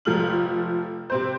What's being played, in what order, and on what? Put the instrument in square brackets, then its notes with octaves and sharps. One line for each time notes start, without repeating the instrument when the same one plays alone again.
[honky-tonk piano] F1 F3 A3 F6 F#7
C3 C4 C5